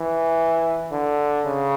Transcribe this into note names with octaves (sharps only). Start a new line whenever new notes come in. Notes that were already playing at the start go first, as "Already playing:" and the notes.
Already playing: E3
D3
C#3